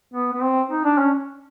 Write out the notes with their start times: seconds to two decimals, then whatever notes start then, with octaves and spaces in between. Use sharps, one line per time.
0.14 B3
0.33 B3
0.42 C4
0.71 D#4
0.85 D4
0.98 C#4